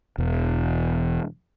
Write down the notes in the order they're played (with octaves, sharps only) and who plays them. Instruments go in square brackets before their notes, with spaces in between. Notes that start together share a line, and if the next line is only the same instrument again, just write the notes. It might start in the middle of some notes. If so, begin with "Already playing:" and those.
[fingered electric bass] E1 E2